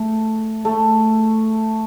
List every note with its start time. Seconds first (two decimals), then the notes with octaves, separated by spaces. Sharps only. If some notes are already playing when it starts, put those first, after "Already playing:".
Already playing: A3
0.65 A3